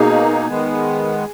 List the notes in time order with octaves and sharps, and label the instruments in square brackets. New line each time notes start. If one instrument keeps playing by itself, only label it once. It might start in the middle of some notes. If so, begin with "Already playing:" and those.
Already playing: [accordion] B2 A#3 D#4 [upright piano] G#4
[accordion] D#3 G#3 B3